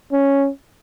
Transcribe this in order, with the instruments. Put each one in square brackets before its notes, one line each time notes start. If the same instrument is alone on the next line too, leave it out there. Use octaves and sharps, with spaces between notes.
[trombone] C#4